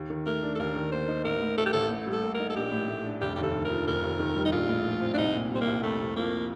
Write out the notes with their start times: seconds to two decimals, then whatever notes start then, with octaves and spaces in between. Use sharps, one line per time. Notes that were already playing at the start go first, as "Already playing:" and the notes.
Already playing: D#2
0.10 D#3
0.26 A3 A#4
0.43 D4
0.55 A4
0.59 D#2 A#4
0.75 D#3
0.92 A#3 C5
1.08 D#4
1.25 A1 A#4
1.41 A2
1.57 A3 A4
1.66 G4
1.73 A1 A4
1.90 A2
2.07 G3
2.12 A4
2.23 A#3
2.34 A#4
2.39 D#4
2.50 A4
2.56 A#1 G4
2.72 A2
2.88 A3
3.05 D4
3.21 F1 G4
3.35 D#2 G4
3.43 A4
3.54 D3
3.65 A#4
3.70 F3
3.87 F1 A#4
4.03 D#2
4.19 D#3
4.36 G3
4.45 D#4
4.52 A#1 F4
4.69 A2
4.86 F3
5.02 C4
5.14 D4
5.18 C2 D#4
5.34 A#2
5.51 G3 C4
5.61 A#3
5.67 C2
5.83 F2 A3
6.00 C3
6.16 F3 A#3